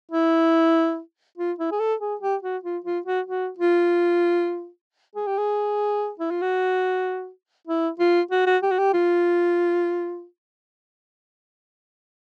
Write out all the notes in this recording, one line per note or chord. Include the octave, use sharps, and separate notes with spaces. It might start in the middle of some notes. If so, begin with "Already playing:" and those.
E4
F4
E4
G#4
A4
G#4
G4
F#4
F4
F4
F#4
F#4
F4
G#4
G4
G#4
E4
F4
F#4
E4
F4
F#4
F#4
G4
F#4
G4
F4